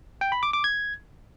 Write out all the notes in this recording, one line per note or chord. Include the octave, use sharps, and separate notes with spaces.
G5
B5
D6
D6
G#6